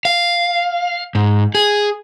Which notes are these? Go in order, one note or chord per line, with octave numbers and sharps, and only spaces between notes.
F5
G#2
G#4